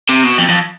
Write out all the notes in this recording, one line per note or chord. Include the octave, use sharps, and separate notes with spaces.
C3
B2
F2
F2